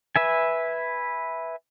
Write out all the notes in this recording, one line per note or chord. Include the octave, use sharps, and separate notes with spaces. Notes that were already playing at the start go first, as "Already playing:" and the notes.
B4 E5 G#5